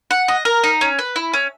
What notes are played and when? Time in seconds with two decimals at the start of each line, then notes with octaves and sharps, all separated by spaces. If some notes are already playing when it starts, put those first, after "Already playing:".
0.11 F#5
0.28 D#5
0.45 A#4
0.64 D#4
0.81 C#4
0.99 B4
1.16 E4
1.33 C#4